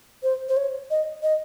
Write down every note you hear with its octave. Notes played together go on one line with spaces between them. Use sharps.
C5
C5
C#5
D#5
D#5